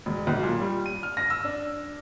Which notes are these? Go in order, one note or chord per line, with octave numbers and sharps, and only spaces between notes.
E1
B1
A#2
G3
D#7
F6
A#6
E6
D4